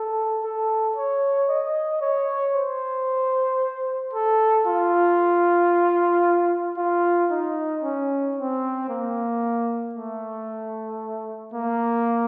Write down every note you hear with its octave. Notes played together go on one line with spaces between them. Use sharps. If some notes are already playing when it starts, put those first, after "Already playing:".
Already playing: A4
A4
C#5
D#5
C#5
C5
A4
F4
F4
D#4
C#4
C4
A#3
A3
A#3